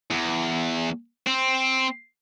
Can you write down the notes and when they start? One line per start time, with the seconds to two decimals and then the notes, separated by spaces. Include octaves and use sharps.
0.11 E2
1.26 C4